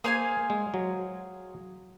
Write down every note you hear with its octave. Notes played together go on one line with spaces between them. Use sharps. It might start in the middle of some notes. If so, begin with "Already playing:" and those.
A#3 G#4 C5 F5 G#5
G#3
F#3